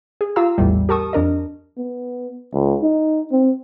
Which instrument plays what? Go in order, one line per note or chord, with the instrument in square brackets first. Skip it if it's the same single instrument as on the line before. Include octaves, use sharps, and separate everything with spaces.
[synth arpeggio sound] G#4
F4 G4 F5 A#5 E6
A#1 E2 A2 G3
G4 A#4 A5 C#6 D#6
F2 D4 A#4 D#5
[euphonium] B3
C#2
D#4
C4